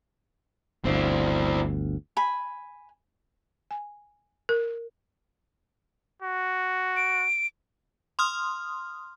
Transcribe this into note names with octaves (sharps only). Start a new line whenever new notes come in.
G1 D2 C4 E4
G#5 B5
G#5
A#4
F#4
D7
C6 D#6 F6